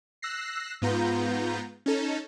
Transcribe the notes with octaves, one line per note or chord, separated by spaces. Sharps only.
E6 F#6 A#6 C7
G#2 B3 F4 A#5 G6
C#4 D#4 A4